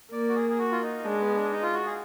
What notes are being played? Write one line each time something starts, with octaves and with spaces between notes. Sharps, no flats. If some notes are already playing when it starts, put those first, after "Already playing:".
A#3 D5
F#4
G#4
G#4
F#4
F4
D#4
G#3 D4
B3
D4
D#4
F4
F#4
G#4